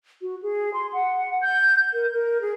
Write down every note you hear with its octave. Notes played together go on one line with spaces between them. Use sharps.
F#4
G#4
C6
F#5
G6
A#4
A#4
G#4